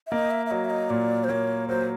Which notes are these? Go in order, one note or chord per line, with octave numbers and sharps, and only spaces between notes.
E5
A#3 D#5
E5
E5
F#3 D#5
E5
D#5
A#2 D5
C5
A#3 C#5
F#3 C5